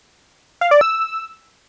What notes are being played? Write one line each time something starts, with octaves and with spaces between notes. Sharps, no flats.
F5
D5
E6